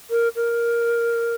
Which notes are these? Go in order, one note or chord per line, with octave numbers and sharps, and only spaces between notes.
A#4
A#4